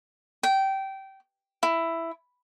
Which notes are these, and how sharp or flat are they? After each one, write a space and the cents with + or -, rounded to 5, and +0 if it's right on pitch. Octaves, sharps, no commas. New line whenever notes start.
G5 -20
E4 +5